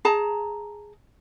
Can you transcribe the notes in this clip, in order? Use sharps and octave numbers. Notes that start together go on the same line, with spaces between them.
G#4 A5 A#5